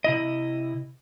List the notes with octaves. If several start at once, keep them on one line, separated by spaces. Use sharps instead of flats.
C3 E4 D#5